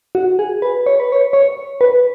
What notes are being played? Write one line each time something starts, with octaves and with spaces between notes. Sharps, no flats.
F#4
G#4
B4
C#5
B4
C#5
C#5
B4